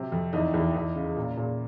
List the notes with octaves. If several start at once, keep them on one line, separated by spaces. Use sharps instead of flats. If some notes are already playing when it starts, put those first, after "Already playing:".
Already playing: C3 F#3
F2
E2 D#4
E2
E2
C#3
A#2
A#2